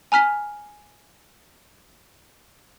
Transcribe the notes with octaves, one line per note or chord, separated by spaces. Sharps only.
G#5 A#5 F6 B6